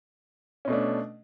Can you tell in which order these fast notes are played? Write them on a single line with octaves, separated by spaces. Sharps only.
C#4 B2 A3 D4